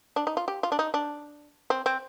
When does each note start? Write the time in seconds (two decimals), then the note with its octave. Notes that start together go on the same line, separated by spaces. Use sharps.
0.16 D4
0.27 D#4
0.37 F4
0.48 G4
0.63 F4
0.72 D4
0.79 D#4
0.94 D4
1.70 C4
1.86 C4